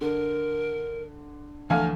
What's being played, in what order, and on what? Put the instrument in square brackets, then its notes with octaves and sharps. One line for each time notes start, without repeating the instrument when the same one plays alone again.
[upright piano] D3 [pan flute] A#4
[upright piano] D2 F5 G#5 [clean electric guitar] D3 E3 F3 [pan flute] F6